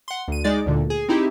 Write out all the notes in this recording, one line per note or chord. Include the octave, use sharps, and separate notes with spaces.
F#5 C6
D2 D#7
G#3 D#4 D5 A6
D2 A#2 D3
G#4
C4 D#4 E4 G4